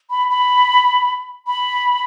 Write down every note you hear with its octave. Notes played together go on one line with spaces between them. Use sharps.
B5
B5
B5